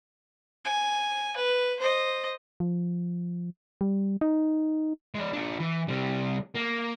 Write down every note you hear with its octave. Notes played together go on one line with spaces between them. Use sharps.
G#5
B4
C5 D#5
F3
G3
D#4
G#3 D5
D4 F4
E3
C3 G3
A#3